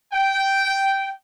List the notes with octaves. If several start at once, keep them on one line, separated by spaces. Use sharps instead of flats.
G5